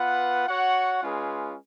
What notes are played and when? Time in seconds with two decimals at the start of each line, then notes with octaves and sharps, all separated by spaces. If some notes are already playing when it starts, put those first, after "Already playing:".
Already playing: B3 F4 B4 F#5
0.47 F#4 C#5 F#5
1.02 G#3 C#4 F4 G#4 B4